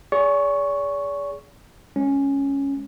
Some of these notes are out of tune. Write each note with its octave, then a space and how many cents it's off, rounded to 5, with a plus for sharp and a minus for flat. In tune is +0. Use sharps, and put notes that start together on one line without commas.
G#4 +0 D5 -45 C#6 +0
G#3 +0 C#4 +0